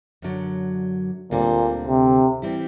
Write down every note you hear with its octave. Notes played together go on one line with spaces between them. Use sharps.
F#2 D3 F#3
D2 A#2 D3 G3 C4
C3
E3 G3 C4 E4